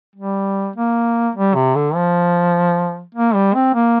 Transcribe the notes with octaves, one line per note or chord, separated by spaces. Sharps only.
G3
A#3
G3
C3
D3
F3
A#3
G3
C4
A#3